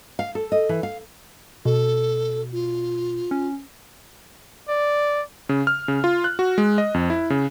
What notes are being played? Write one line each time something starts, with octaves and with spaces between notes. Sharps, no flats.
F5
A4
D#5
E3
F5
B2 A4
F4
C#4
D5
C#3
F6
C#3
F4
F#6
F#4
G#3
D#5
F2
E4
C#3